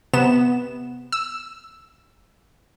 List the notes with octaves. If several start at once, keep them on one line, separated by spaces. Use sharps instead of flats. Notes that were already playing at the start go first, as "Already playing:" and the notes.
C3 B3 E7
E6